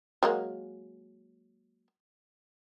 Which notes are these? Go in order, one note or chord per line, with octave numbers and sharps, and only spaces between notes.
F#3 G#3 A#3